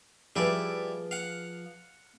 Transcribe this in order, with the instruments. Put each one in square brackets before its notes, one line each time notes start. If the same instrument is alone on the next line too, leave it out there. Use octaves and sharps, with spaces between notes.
[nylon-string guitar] F3 G#4 B4 [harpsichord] G3 E4 D5
[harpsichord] F5 F#5